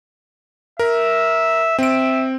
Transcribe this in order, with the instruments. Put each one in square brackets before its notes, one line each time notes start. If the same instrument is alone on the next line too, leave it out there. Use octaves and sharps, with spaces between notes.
[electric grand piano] A#4 [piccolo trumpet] E5
[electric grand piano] C4 D7 [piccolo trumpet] E5